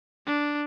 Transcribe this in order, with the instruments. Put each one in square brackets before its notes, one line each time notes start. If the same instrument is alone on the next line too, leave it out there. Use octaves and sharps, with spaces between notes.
[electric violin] D4